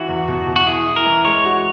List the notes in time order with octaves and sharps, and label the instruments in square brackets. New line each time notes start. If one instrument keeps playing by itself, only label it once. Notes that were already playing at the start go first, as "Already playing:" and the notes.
Already playing: [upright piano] E3 [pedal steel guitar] F#4
[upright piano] E2
B2
B2
[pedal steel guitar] F#4
[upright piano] E4 [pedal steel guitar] G#4
[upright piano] E4
[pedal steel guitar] A#4
[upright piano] E3
[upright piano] G#3 [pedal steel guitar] C#5
[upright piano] F#4